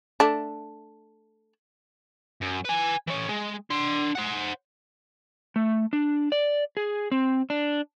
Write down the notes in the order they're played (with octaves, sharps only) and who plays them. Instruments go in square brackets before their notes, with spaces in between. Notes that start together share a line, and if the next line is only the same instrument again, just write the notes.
[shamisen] A3 D4
[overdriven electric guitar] F#2
B4 G#5
E3 C#4
G#3
D4 C6
C5 F#5
[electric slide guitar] A3
D4
D5
G#4
C4
D4